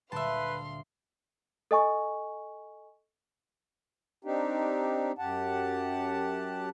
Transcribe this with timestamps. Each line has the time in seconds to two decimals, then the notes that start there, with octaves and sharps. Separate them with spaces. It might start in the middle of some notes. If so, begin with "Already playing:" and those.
0.12 D2 A#2 G3 B4 E5 F5 A5 C6
1.71 A4 D#5 G#5 C#6
4.24 C4 D4 D#4 G4
5.19 F#2 G4 F#5 A5